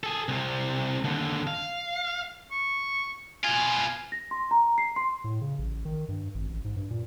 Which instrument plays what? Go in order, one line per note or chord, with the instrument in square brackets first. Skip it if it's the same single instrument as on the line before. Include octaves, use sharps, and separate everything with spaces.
[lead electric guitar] G#4 A4
C2 C3
D#2 D3
F5
[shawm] C#6
[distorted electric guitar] B2 F4 [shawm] G#5
[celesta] A#6
C6
A#5
C7
C6
[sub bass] A2
C#3
A1
D#3
G2
G#1
A1
G#2
G2
A#2